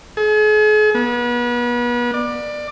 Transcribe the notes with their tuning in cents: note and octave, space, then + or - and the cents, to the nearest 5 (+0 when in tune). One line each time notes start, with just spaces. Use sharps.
G#4 +40
B3 -35
D5 +20